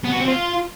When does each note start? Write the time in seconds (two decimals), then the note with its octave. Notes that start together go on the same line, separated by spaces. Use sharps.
0.05 B3
0.13 F#4
0.21 C4
0.29 F4